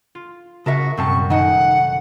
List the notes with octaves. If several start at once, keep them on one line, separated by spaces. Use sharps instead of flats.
F4
C#3 F#4 A#4 E5 A5 A#6
C2 F#2 A#2 G3 C4 A5 C#6
F1 D#3 D#4 F#5 G#5 A5